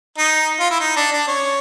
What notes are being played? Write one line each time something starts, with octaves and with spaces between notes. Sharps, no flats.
D#4
F4
E4
D#4
D4
D4
C#4